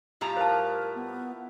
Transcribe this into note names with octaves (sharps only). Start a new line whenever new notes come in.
A2 F3 G3 E4 A#5
A#4 C5 A5
B3